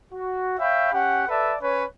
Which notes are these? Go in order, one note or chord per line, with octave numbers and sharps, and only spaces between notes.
F#4
C#5 E5 F5 G5 B5
C#4 G4 F#5
A4 B4 D5 E5 A5
C#4 B4 C#5